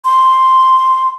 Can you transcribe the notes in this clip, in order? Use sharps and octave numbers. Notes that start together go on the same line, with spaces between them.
C6